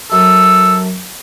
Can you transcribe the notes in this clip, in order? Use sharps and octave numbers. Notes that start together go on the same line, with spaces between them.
F#2 A4